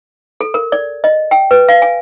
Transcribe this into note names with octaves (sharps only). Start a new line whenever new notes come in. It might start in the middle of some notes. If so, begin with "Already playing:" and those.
A4
A#4
D5
D#5
G5
B4
F5
G#5